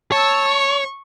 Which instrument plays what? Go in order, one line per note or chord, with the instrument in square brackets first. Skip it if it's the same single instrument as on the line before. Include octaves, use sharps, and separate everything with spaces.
[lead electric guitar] C#5 [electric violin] A5 E6
[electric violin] C#6